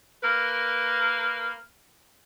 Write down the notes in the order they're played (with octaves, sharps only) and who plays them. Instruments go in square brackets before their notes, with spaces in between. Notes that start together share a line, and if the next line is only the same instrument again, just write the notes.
[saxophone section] A#3 A#4 B4